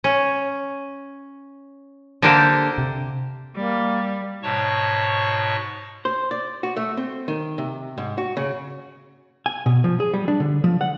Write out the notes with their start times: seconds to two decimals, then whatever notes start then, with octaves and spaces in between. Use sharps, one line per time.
0.04 C#4
2.22 D3 A#3 D4 G4 C5
2.78 C3
3.56 G3 A#3
4.43 G#2 B2 C#5 A5 C#6
6.05 C5
6.31 D5
6.63 F#4
6.77 A3
6.97 C4
7.28 D#3
7.58 C3
7.98 G#2
8.18 F#4
8.37 C#3
9.46 G#5
9.66 B2
9.84 F3
10.00 G#4
10.14 G3
10.28 D4
10.40 D3
10.64 F3
10.81 F#5